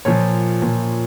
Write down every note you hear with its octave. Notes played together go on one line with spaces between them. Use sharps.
A#2 F3 C#5
A#2 F3